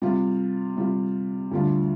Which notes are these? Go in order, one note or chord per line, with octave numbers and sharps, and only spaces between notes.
C3 G3 F4
C3 G3 F4
D2 D3 G3 D4 F4